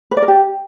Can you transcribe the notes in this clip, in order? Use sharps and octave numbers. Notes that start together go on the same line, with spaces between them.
B4
D5
A#4
G4